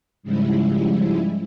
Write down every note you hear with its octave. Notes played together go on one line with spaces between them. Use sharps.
G#2 C#3 F3 G3 G#3 E4